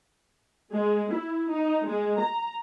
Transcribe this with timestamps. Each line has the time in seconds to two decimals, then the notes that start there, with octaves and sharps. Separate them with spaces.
0.73 G#3
1.14 E4
1.51 D#4
1.88 G#3
2.19 A#5